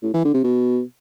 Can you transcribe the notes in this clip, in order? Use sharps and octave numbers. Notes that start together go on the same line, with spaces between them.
A2
E3
D3
C3
B2